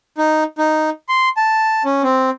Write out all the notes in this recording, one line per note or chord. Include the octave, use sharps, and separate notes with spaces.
D#4
D#4
C6
A5
C#4
C4